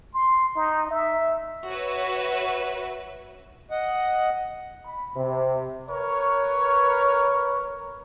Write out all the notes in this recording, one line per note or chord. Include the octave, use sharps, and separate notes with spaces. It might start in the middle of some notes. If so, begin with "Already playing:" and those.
C6
D#4
E5
F#4 B4 C#5 E5
D#5 F#5
B5
C3
A#4 B4 C#5